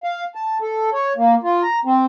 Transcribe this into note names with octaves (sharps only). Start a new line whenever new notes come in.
F5
A5
A4
C#5
A#3
F4
A#5
C4